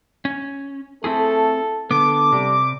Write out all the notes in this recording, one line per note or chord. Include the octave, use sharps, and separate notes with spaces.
C#4
A3 C4 E4 G#4 A4
D3 B3 A4 D6
C3 G3